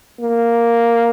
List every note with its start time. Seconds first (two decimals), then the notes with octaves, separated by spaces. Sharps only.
0.21 A#3